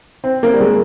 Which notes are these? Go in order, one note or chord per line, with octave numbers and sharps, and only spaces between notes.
C4
A#3
G3
G#3